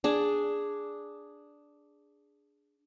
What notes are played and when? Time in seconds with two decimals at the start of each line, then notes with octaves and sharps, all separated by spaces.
0.04 D4 G#4